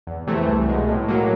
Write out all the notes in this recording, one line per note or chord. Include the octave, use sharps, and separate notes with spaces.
E2
C3 E3 A3
C2
B2 G#3
A2
F#3 A#3